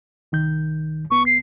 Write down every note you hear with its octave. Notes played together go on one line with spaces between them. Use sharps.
C2 D#3 G6
C2 B3 C#6
C7